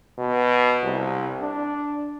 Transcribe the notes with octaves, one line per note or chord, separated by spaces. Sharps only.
B2
C2
D4